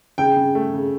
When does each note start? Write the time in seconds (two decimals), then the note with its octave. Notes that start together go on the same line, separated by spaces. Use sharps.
0.18 C#3 G5
0.36 C#3
0.55 A3
0.73 C#3